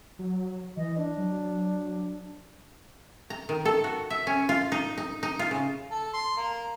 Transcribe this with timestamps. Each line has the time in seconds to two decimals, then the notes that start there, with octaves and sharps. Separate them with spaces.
0.19 F#3
0.77 E3 D#5
0.98 D4
1.17 F#3
3.30 A#5
3.49 D#3
3.65 A4
3.84 F#4
4.10 E5
4.27 C#4
4.49 F4
4.72 D#4
4.98 D#4
5.23 D#4
5.39 F4
5.51 C#3
5.91 A4
6.14 C6
6.37 A#3